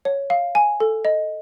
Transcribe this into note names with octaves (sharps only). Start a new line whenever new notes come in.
C#5
F5
G#5
A4
D#5